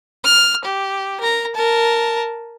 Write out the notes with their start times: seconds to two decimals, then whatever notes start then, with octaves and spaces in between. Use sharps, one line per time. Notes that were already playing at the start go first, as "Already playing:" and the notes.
0.24 F6
0.65 G4
1.20 A#4 A#5
1.55 A#4 A5